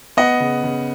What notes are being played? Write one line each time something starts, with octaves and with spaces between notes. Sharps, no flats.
B3 D#5 F#5
C#3
C#3